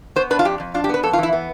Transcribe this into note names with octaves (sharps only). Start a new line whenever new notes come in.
B3 C5
D4 B4
F4
F2 G4
F2
D4 F4
G4
B3 B4
F2 A4
F4
E3
E4
B3